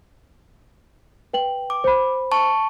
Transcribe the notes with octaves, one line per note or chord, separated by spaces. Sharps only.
B4 G5 F#7
D6
C5 B5
A5 C#6